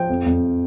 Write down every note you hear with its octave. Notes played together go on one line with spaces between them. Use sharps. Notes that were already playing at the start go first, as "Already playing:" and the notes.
Already playing: F3 G5
F2
F2